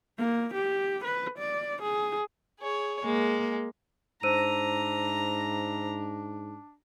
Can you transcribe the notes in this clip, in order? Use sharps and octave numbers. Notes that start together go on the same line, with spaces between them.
A#3
G4
B4
D5
G#4
G#4 C#5
G#3 A#3
G#2 D4 C5 A#5 E6 D#7